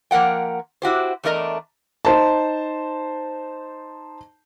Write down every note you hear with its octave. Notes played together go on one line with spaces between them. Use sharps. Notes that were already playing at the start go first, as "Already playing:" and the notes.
F3 A#3 A#4 F#5 G5
E4 F#4 G4 C5
E2 A3 D4 A#4 D#5 A#5
D#4 C5 A5